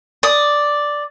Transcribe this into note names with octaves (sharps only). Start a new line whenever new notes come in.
D5 D#6